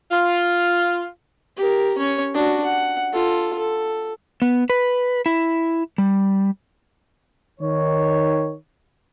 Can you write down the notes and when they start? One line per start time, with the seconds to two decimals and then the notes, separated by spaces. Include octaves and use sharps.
0.11 F4
1.57 G4 A#4
1.98 C#4 C#5
2.34 D4 F#4
2.65 F#5
3.13 F4 A4
3.59 A4
4.42 B3
4.70 B4
5.26 E4
5.98 G3
7.60 D#3 C#5